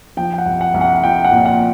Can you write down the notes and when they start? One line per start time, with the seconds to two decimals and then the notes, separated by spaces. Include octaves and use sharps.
0.17 F3 G5
0.33 G5
0.38 F#5
0.46 C2
0.61 F#5
0.74 C2
0.81 F#5
1.03 F3 G5
1.25 F#5
1.32 A#2
1.46 F#5